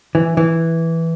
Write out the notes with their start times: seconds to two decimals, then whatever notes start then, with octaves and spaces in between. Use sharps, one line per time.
0.15 E3
0.37 E3